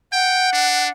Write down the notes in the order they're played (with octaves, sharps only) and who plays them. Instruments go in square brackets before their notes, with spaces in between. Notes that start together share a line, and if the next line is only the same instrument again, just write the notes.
[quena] F#5 [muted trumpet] G5
[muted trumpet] D4